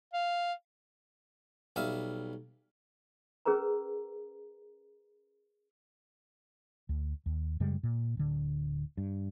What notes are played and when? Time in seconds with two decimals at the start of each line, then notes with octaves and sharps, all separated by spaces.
0.13 F5
1.76 B1 G3 E5 F5
3.46 C#4 G#4 A#4 B4 A#5
6.89 D2
7.26 D#2
7.60 F#2 C#3 G3 G#3
7.83 A#2
8.17 D1 D3
8.98 G2